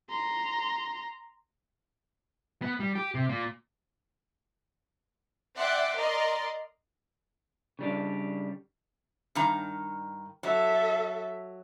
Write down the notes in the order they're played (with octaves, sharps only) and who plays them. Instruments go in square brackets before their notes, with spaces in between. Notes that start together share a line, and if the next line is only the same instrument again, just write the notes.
[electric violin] A#5 C6
[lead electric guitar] B3
G3
G4
C3
A#2
[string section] D5 E5 F#5 G5 C6 D6
A#4 D5 D#5 A#5 C6
[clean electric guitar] C#3 G3 D4
[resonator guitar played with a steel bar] G2 D#3 A#5
[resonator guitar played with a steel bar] F#3 [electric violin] A4 E5